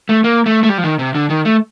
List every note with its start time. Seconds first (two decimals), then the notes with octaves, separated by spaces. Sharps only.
0.09 A3
0.24 A#3
0.46 A3
0.63 A3
0.69 G3
0.78 F3
0.84 D#3
0.99 C3
1.15 D3
1.30 D#3
1.45 A3